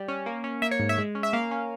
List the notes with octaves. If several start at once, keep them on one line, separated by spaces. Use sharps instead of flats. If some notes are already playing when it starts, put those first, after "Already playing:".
Already playing: G3
C#4
A#3
C#4
A#3 E5
C#5
G#2
E5
G#3
C#4
E5
A#3 F5
C#4